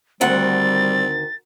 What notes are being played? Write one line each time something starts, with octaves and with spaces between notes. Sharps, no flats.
D2 D#3 G3 C4 F#5 A6